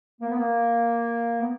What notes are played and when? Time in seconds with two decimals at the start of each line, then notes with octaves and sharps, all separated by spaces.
0.20 A#3
0.29 B3
0.37 A#3
1.41 B3